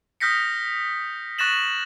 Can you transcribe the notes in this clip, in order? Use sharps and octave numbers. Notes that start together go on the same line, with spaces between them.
D#6 F6 G6 A#6 B6 C#7
C#6 F#6 A6 A#6 E7 F#7